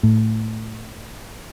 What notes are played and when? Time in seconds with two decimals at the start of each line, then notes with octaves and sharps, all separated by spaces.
0.03 A2